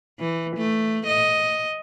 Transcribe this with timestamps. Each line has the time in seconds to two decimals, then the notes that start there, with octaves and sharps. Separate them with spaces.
0.20 E3
0.57 A3
1.07 D#5